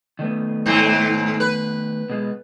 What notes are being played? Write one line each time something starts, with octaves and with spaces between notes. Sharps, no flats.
D#3 A3 B3
G#2 C4
B4
B2 G#3